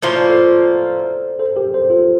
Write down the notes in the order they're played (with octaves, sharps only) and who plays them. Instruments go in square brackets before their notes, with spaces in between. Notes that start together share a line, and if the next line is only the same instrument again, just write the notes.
[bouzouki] A2 F3 A#3 F4 [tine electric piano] C5
[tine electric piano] D5
A4 C5
A4 C5
G4 A#4
A4 C5
F4 A4